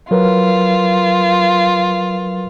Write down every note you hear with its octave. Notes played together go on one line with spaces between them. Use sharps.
F#3 F4 A#4 B4